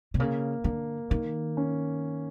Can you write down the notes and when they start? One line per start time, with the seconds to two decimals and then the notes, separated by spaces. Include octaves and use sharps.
0.14 C3
0.20 C#3 A#3
0.64 D3 A#3
1.10 D#3 A#3
1.57 C#4